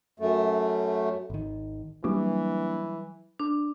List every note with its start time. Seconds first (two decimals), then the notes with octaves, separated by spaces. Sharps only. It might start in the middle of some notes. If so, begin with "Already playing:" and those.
0.20 F#2 A3
1.30 G#1 D#3
2.04 E3 F#3 G3 A#3 D4
3.40 D4